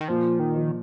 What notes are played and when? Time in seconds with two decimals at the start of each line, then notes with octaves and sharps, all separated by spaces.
0.01 D#3
0.08 A#2 F3
0.39 D#3
0.54 F3